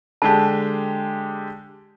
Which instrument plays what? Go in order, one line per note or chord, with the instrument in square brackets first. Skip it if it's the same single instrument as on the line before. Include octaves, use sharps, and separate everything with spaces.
[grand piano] D3 G#3 G4 [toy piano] A5